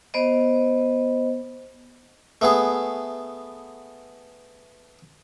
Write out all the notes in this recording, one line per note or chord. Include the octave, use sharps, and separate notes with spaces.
B3 C5 D#5
A3 B3 G#4